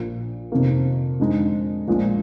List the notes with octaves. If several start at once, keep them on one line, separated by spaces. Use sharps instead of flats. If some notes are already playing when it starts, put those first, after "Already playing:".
Already playing: A#1 A#2 F3
F2 C3 D#3 A#3
F2 D3 G#3 D#4
A#1 A#2 F3 G#3